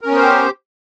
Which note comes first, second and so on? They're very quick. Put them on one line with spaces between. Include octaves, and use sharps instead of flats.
A#4 C#4 B3 C5 G4